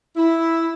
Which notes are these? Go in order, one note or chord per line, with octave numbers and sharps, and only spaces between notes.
E4